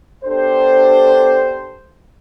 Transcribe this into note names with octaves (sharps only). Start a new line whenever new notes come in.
B3 D4 G4 A4 C5